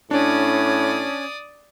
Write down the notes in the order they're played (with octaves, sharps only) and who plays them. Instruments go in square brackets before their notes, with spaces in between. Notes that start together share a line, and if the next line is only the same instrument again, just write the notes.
[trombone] A2 [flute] C#4 [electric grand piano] D4 [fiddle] D5 D#6